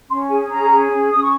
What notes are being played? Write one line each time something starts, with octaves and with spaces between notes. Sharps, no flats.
C#4 C6
G#4 G#5
C#4 A#5
G#4
C#4
C#4 D#6
C#6